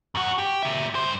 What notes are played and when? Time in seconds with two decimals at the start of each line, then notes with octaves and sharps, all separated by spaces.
0.15 F#2 F#4
0.38 G4
0.63 A#2 E5
0.95 G2 C5